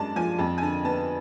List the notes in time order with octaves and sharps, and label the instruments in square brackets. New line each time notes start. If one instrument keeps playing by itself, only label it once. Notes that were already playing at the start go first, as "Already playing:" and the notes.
Already playing: [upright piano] F#2 G#3 D4 D5 A5
F3 G#5
F2 A5
G#5
D3 A5
B3 A5